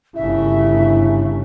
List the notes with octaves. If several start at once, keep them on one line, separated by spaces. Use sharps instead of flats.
G1 C#3 E4 E5